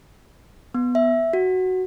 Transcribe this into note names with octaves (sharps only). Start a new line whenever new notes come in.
B3
E5
F#4